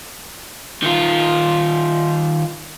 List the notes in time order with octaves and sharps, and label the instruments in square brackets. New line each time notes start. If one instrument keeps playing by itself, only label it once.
[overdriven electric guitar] D#3 F4